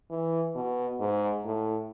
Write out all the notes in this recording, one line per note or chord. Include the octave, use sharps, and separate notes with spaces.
E3
B2
G#2
A2